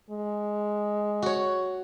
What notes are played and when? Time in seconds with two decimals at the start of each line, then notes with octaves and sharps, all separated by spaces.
0.10 G#3
1.22 F#4 C#5